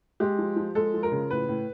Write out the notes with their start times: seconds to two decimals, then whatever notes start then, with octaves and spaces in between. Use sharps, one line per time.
0.20 G#3 G4
0.39 F3
0.56 F3
0.75 G#3 A4
0.94 F3
1.03 A#4
1.12 C#3
1.30 A2 B4
1.49 A2